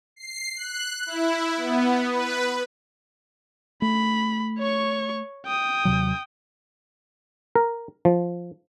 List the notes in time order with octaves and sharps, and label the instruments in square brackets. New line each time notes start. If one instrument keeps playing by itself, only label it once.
[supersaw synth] C7
F#6
E4
B3
B4
[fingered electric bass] A3 [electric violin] B5
[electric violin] C#5 C#6
G5 D#6
[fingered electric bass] D#2 C3 F#3
[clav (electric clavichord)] A#4
F3